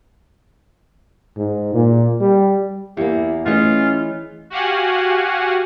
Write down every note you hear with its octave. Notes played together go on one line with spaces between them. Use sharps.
G#2
A#2
G3
E2 A#3 E4 G4 E5
E3 A3 C#4 F4 G#4 D#5
F#4 G4 F5 F#5 G#5